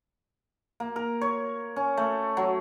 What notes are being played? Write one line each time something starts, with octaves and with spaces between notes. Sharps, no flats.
A#3
A#4
C#5
C#4
A3
F#3